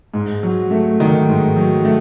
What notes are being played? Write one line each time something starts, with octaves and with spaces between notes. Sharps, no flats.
G#2
F#3
A3
D#3
G#2
F#3
A3